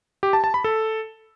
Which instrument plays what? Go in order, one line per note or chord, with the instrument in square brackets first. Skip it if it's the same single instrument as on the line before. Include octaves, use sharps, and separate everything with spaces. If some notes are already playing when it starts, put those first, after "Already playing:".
[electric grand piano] G4
A5
A5
B5
A4